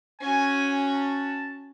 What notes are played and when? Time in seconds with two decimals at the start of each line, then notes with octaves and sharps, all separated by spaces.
0.20 C#4 F#4 G#5
0.95 A5